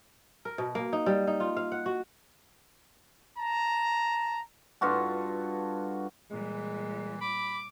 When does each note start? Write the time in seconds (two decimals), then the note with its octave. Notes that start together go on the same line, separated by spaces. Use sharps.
0.45 A#4
0.58 B2
0.75 A#3
0.93 D#4
1.06 G3
1.27 D#4
1.40 F4
1.57 F5
1.72 F#5
1.86 F#4
3.37 A5 A#5
4.81 G2 F4 F#4 A4
6.31 A#2 E3 G3 G#3
7.21 B5 D6